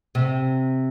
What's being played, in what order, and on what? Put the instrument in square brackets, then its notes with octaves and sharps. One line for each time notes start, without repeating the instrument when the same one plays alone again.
[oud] C3